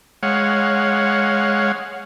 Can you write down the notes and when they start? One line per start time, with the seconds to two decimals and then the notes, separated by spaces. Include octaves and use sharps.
0.23 G#3 C#5 F5 F#5